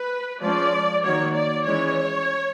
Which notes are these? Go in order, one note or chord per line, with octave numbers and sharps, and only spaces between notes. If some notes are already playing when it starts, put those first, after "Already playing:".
Already playing: B4
F3 G#3 C#4 D5
D#3 F#3 A#3 C#5
D5
E3 G#3 C#4 C#5